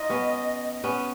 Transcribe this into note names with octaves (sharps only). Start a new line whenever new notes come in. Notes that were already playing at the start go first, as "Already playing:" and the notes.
Already playing: D#4 F4 D#5
B3 C#4
B3 C#4